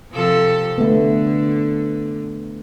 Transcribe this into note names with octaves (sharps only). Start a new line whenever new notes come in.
C3 F3 A4
D3 A3 B3